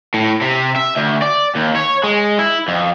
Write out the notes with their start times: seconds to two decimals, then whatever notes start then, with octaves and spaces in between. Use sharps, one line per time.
0.14 A2
0.42 C3
0.76 E5
0.96 D2
1.22 D5
1.56 D#2
1.76 C#5
2.04 G#3
2.39 E4
2.68 F2